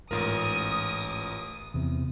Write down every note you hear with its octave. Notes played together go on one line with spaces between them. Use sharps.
A1 G#2 F4 A#4 D#6
E2 C3 E3